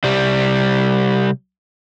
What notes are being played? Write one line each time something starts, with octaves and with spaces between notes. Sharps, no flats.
C2 G3